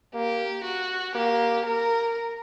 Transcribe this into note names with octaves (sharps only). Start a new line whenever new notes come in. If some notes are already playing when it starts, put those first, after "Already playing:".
A#3 G4
F#4
A#3 G4
A#4